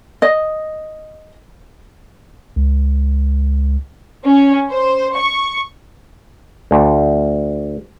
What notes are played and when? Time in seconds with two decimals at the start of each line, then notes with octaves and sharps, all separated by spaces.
0.22 D#5
2.56 C#2
4.26 C#4
4.71 C5
5.17 C#6
6.71 D2